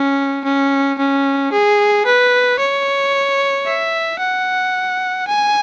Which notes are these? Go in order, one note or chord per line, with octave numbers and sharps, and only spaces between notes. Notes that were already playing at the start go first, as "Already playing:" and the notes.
Already playing: C#4
C#4
C#4
G#4
B4
C#5
E5
F#5
G#5